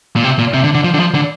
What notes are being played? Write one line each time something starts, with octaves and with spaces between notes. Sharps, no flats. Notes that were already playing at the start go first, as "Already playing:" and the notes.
A#2
C3
A#2
C3
D3
D3
F3
D3
F3
D3